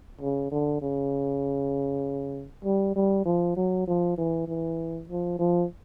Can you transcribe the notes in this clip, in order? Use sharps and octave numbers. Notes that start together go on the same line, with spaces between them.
C#3
D3
C#3
G3
G3
F3
F#3
F3
E3
E3
F3
F3